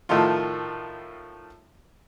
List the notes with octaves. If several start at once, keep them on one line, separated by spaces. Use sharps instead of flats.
A2 D#3 F3 A3 D#4 F4